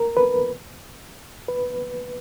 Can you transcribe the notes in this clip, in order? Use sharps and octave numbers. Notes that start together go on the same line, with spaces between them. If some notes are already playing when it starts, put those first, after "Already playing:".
Already playing: A#4
B4
B4